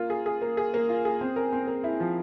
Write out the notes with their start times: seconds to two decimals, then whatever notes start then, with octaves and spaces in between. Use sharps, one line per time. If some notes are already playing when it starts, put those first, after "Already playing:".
Already playing: A#3 F4
0.10 G#4
0.26 G#4
0.42 A#3
0.57 G#4
0.74 A#3
0.89 F4
1.05 G#4
1.21 C4
1.36 A#4
1.53 C4
1.68 A#4
1.84 E4
2.00 F3